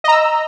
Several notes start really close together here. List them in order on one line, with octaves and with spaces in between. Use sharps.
D#5 A#5 E6